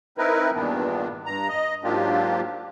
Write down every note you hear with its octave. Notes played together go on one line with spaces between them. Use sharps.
C4 D#4 E4 A#4 B4
E2 G2 A#2 D#3 B3 D4
G2 A#5
D#5
G#2 F#3 A#3 D4 F4 G4